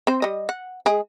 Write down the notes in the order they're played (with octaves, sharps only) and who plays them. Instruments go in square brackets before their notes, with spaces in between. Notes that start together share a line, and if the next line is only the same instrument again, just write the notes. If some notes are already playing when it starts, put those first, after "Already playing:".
[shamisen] C4 C5
G3 D#5
F#5
G#3 G#4